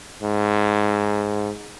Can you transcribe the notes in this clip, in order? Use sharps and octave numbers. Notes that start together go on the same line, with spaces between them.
G#2